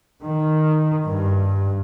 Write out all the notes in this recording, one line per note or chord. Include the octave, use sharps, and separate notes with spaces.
D#3
G2